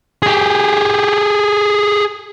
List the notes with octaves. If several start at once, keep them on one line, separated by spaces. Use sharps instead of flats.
G4 G#4